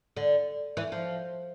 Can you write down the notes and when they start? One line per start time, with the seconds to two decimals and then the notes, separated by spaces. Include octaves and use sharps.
0.17 D3
0.77 E3
0.92 F3